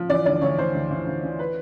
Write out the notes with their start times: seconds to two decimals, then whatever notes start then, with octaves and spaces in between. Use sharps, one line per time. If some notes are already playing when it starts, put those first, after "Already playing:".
Already playing: F3
0.10 E3 D5
0.26 D2 D5
0.42 D2 C#5
0.58 E3 C5
0.74 D2
0.91 E3
1.07 D2
1.23 E3
1.39 B4